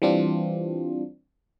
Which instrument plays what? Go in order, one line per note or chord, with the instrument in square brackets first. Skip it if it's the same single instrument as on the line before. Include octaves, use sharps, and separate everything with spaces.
[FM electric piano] E3 G3 C4 D4 F4